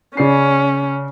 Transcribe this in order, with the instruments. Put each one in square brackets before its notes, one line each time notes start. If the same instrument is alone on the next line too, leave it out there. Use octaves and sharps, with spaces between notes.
[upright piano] C#3 D5 C7 [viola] C#4